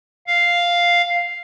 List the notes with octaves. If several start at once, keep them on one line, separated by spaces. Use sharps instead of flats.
F5